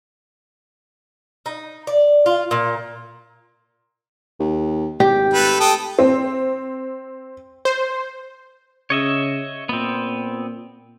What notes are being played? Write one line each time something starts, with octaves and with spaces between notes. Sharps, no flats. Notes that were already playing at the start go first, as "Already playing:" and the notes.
D#4
D5
F4
A#2
D#2
G#1 G4
A3 B4
A4 G5 D#6
C4
C5
C#3 C#5 D#5 E5
A#2 B3 C4